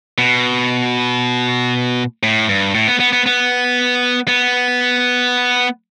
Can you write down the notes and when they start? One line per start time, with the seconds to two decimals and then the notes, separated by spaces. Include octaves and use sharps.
0.18 B2
2.23 A2
2.49 G2
2.75 A2
2.88 B3
3.00 B3
3.13 B3
3.26 B3
4.28 B3